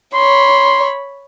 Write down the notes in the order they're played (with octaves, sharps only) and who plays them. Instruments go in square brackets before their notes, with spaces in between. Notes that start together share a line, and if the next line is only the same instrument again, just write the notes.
[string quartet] C#5 B5 [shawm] C6